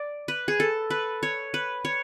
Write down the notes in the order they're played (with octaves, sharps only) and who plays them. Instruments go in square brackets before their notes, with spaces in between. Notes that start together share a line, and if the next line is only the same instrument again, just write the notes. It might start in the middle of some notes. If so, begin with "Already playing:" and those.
Already playing: [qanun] D5
B4
G#4
A4
B4
C#5
B4
C#5